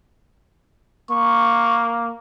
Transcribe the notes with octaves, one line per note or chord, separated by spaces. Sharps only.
A#3 C#6